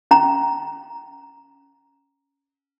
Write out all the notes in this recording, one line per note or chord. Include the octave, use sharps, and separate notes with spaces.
C#4 A#5